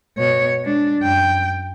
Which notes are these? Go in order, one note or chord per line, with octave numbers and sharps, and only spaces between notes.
B2 C#5
G#3 D4
F#2 G5